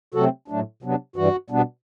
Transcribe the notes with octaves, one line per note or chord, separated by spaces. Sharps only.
C3 F#3 A3 C4 F#4 A4
A2 F#3 A3 D4
C3 F#3 B3 D4
G2 E3 G3 F#4
B2 G3 B3 D4